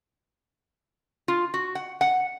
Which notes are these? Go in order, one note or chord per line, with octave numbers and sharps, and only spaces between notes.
F4
F#4
F#5
F#5